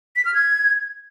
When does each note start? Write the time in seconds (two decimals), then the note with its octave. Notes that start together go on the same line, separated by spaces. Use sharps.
0.16 B6
0.25 F6
0.34 G#6